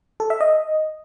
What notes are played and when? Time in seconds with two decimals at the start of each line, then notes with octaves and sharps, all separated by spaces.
0.20 A4
0.30 E5
0.41 D#5